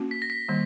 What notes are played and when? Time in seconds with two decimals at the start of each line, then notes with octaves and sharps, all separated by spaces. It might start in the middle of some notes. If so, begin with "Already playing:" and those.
Already playing: A#3 C#4 F#4
0.11 B6
0.22 A#6
0.30 B6
0.49 D#3 G3 A#3